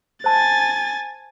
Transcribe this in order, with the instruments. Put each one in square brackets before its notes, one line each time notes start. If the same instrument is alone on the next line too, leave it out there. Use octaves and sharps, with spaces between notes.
[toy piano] C5 A5 [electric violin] G#5 A6